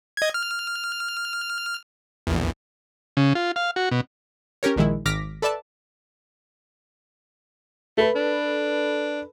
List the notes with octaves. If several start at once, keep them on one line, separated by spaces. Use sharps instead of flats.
D#5 G#6
F6
A#1 E2
C#3
F4
F5
F#4
B2
C#4 G4 A#4 C#5
A#1 A#2 D#3 G#3 E4
G#1 D6 F6 A#6 B6
A4 B4 D5 E5 A5
A3 A4 B4
D4